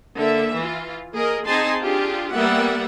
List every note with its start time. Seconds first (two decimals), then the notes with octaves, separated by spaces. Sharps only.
0.17 D3 A#3 E5
0.56 E3 F4
1.14 A#3 G#4 A#4 D#5
1.45 C4 D#4 G#4 G#5 A5 C6
1.81 D4 F4 G4 G#4
2.31 G3 A#3 B3 D5 E5 F#5